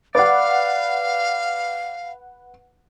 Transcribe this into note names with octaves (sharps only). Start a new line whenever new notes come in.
B4 D5 F5 F#5